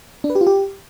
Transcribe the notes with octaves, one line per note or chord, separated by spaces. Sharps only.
D4
B4
G4
F4
G4